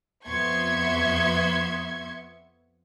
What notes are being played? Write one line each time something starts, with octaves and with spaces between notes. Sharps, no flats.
F2 B3 E5 C6 C#6 G#6